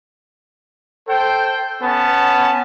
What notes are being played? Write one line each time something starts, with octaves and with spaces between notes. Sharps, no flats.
A4 C5 G5
B3 C#4 A5